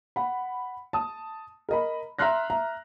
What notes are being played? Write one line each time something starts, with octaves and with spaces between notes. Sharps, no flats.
F#5 B5
A5 D#6
A#4 D#5 B5
E5 A#5 C6 F6 F#6 A#6
E5 A#5